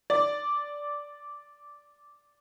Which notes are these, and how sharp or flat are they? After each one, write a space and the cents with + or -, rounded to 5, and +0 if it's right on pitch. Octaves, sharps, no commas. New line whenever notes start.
D5 -10